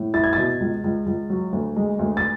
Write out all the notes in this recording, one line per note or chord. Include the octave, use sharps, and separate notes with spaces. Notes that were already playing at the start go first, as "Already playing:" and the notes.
Already playing: A2
E4 A6
G#6
B2 A6
C#2
C#2
C#2
F#3
D2
G#3
D2
A6